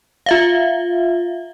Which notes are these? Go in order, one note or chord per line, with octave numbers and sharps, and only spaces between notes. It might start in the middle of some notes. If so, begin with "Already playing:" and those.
F4 E5 F5